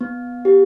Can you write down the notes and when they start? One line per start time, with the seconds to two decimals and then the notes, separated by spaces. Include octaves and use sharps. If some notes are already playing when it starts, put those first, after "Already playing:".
0.01 B3
0.45 G4